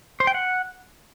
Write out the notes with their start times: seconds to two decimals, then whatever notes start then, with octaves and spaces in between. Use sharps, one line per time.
0.20 C5
0.27 G5
0.34 F#5